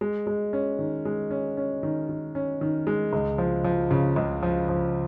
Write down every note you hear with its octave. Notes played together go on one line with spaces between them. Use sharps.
G#3
G#3
C#4
D#3
G#3
C#4
C#4
D#3
D#3
C#4
D#3
G#3
C#2
F3
F3
C#3
C#2
F3
F3